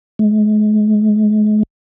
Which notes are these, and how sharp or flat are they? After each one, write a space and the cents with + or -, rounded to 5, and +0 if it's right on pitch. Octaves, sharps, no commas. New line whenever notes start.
G#3 +40